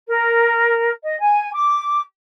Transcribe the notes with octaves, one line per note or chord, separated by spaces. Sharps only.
A#4
D#5
G#5
D6